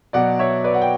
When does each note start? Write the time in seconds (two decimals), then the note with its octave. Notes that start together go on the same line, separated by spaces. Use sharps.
0.13 B2 F#3 D5 F#5
0.39 C#5 E5
0.64 B4 D5
0.74 F#5
0.82 G5